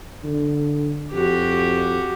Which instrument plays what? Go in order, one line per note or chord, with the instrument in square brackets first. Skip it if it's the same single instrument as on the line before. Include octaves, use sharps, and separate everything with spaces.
[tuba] D3
[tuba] F2 [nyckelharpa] F#4 G4